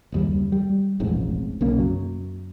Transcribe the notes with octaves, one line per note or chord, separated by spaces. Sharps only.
F#1 D#2 G3
G3
E1 A1 F2 G#2
B1 C#3 A#3
F#2 F#3